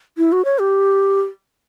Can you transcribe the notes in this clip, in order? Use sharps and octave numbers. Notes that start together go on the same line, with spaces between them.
E4
F#4
C#5
G4